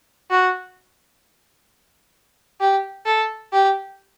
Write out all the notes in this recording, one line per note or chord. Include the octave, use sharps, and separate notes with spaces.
F#4
G4
A4
G4